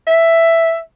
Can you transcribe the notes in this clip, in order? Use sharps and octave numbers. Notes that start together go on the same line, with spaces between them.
E5